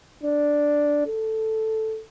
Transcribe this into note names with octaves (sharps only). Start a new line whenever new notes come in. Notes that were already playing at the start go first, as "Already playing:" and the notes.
D4
A4